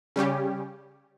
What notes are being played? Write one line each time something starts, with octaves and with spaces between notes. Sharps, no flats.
C#3 G3 C#4 G4